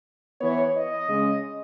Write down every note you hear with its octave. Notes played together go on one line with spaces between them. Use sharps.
E3 B3 C#5
D#5
C#3 G#3 C#4